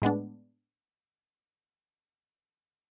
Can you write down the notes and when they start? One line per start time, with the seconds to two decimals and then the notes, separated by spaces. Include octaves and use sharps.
0.02 A2 G#3 B3 D4